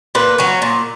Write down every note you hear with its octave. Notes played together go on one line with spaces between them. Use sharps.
A#2 B4
F#3 C#4
A#2